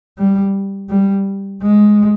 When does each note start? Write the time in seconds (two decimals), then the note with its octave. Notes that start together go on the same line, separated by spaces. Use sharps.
0.18 G3
0.89 G3
1.62 G#3